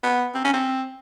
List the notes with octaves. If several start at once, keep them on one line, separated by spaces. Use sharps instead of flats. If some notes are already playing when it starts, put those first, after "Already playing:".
B3
C4
C#4
C4